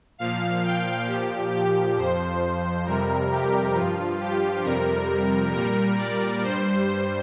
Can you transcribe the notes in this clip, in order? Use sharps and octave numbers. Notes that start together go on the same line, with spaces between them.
A#2 F3 F5
G5
A#2 F3 G4
G4
F2 F3 C5
F2 C3 G3 A#4
G4
G2 F3 F4
G4
F2 C3 G3 A#4
A#2 G3 A#4
D5
G2 G3 C5
C5